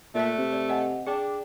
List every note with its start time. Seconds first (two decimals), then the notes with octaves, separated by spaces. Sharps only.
0.15 A#2 A3 E5 F#6 B6
0.38 C3
0.53 D5
0.69 D#5 F#5 G#5
1.07 D4 G#4 G5 D6